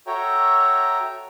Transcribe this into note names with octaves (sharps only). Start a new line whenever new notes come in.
F#4 A4 C#5 E5 G5 A#5